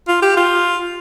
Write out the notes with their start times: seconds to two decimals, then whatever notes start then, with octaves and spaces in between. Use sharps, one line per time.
0.08 F4
0.22 G4
0.37 F4